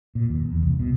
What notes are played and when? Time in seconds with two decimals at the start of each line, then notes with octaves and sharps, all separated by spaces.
0.15 A#2
0.30 D#2
0.44 E2
0.63 C2
0.79 B2